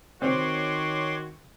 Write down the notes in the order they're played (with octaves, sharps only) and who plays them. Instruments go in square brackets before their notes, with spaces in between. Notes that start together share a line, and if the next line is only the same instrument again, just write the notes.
[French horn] D#3 [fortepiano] C4 [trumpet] F#4 [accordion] C#5 C6 D6